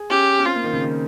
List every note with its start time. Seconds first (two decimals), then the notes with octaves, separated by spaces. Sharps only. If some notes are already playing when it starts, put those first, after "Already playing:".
Already playing: G#4
0.10 C#4 G4
0.39 C#4
0.46 C4 F4
0.55 A#3
0.64 D#3
0.73 C#3
0.82 D#3